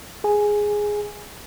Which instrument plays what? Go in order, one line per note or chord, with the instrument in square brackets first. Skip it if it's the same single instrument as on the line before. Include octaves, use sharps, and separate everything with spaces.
[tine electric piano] G#4 G#5